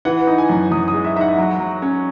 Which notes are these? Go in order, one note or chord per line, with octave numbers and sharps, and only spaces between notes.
E3 F#5
D#4
G#5
F#2
F#2 D#6
D#6
G#3
E5
D#4 E5 F#5
F#3
F#3
C#4